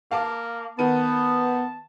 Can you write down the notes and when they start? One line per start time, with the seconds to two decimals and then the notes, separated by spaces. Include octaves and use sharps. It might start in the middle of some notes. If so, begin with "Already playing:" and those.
0.11 A#3 F5 A5 D6
0.79 D#3 B3 A5 D#7